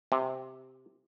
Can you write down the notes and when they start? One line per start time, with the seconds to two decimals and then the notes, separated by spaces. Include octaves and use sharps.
0.12 C3